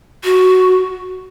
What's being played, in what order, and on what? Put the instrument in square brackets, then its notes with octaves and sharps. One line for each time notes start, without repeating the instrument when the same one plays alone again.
[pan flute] F#4